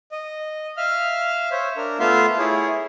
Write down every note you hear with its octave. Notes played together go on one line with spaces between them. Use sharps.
D#5
E5 F5 F6
C5 C#5 E5
D4 A#4
A3 B3 F4 E5 F5 C6
E4 G#4 C#5